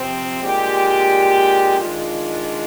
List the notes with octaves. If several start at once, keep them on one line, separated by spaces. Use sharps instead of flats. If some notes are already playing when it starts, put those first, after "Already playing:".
Already playing: C3 F3 C4
A#2 G#3 D4 G4
D#3 G#3 D4 F4